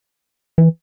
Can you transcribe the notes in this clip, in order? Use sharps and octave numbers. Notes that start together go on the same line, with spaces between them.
E3